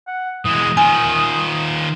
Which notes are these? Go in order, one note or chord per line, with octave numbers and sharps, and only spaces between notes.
F#5
E3 G#3 D#6
D#3 F4 G#5